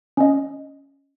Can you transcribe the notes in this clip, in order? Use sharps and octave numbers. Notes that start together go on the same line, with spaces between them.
C#4 D#5